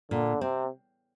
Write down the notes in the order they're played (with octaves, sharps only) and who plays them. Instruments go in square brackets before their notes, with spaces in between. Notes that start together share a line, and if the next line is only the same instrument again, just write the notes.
[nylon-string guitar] A#2 [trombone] D3
[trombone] C3 [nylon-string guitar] C4